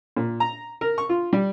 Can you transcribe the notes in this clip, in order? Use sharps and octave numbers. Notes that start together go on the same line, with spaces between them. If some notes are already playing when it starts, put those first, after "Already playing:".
A#2
A#5
A#4
C#6
F4
G3